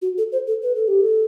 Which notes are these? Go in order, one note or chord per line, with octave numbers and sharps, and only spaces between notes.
F#4
A4
C5
A4
B4
A4
G4
A4